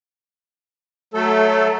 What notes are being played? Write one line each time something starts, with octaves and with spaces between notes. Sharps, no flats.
F#3 A3 A4